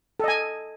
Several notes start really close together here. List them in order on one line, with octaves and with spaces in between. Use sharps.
A4 D#5 G#5